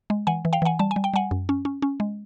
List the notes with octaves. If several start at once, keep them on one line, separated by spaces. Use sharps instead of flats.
G#3
E3 F#5 G#5
E3
F5 G5
E3 F#5 G#5
G3 A5
G#5
G3
G5
G3 F#5 G#5
F#2
C#4
C#4
C#4
G#3